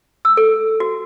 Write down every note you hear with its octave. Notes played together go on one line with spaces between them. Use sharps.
E6
A4
F#4